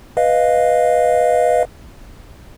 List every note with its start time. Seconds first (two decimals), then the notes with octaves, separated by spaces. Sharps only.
0.17 B4 D#5 F5